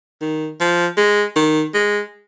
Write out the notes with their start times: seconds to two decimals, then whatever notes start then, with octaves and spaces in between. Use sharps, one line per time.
0.21 D#3
0.60 F3
0.97 G#3
1.36 D#3
1.74 G#3